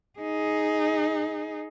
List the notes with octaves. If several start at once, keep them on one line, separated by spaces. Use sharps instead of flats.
D#4 G#4